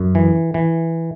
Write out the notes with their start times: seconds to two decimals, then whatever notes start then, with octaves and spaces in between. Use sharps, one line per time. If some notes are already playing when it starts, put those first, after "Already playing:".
Already playing: F#2
0.15 E3
0.54 E3